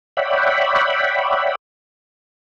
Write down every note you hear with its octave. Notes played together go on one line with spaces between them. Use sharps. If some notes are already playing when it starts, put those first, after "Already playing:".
C#5 D5 E5 F#5 G5 B5